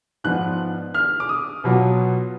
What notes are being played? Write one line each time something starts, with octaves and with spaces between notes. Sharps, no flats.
G#2 F3 B3 D4 F4 F#6
F6
D6
D#6
B2 F#3 B3 F4